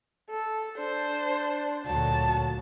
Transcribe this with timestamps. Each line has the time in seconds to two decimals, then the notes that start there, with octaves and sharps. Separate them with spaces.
0.30 A4
0.78 D4 C5
1.86 D2 A#2 F#3 A5